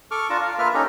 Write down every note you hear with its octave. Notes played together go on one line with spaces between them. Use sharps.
A4 C#6 D6 F6
D4 F4 A5 A#5
F5
A#3 F4 B4 E5 F6
C#4 D#4 G4 A4 A#5